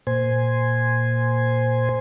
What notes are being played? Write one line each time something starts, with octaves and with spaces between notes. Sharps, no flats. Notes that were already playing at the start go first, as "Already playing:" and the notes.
A#2 C5 G#5